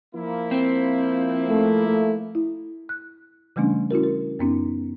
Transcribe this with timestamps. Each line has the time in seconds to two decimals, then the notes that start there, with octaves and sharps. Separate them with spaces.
0.15 F3 A#3 E4
0.51 C4
1.49 A3
1.88 A3
2.35 E4
2.89 F#6
3.56 C#3 E3 G3 A3 C#4 D4
3.91 C#4 E4 F#4 A#4
4.03 A#4
4.39 F#2 B3 C#4 D#4